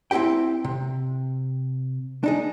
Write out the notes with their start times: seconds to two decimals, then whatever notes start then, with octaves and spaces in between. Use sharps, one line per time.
0.11 C4 E4 F4 G4 G5
0.64 C3
2.24 D4 D#4 G#4